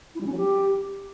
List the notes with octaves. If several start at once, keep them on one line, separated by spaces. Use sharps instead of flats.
E4
G3
C#4
F#3
G4